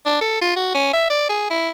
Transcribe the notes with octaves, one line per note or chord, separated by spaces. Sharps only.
D4
A4
F4
F#4
C#4
E5
D5
G#4
E4